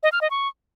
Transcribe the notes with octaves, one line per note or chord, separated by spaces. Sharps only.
D#5
F6
D#5
C#6